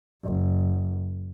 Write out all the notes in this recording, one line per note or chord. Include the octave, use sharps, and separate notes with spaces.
F#1